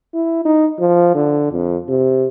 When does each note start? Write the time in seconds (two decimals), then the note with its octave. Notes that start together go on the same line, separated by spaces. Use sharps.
0.14 E4
0.45 D#4
0.80 F3
1.15 D3
1.52 F2
1.89 C3